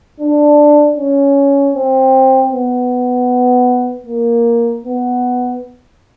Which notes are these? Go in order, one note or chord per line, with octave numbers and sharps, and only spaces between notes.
D4
C#4
C4
B3
A#3
B3